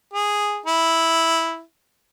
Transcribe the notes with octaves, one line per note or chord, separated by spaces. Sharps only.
G#4
E4